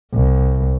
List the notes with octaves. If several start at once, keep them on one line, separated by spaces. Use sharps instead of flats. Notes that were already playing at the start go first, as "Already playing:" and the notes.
C2